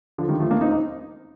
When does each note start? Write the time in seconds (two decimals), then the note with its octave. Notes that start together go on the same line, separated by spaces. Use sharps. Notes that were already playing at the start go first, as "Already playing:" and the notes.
0.18 D3 F3
0.29 D#3 G3
0.39 F3 A3
0.50 A#3 D4
0.61 C4 D#4
0.71 C4 D#4